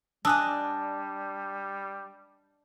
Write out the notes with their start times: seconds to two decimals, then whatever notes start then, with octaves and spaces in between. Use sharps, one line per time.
0.25 G3 D4 D#5 G#5 A5 D#6 E6 F#6